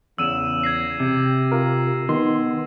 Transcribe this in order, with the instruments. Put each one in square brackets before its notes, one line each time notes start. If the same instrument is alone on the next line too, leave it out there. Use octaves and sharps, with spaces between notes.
[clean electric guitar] E2 [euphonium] C#3 [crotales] E6 D#7 E7
[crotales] G#6 A#6 C7
[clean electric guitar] C3 [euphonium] G4
[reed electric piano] F4 A#4
[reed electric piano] D#3 [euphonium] B3 [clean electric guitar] C6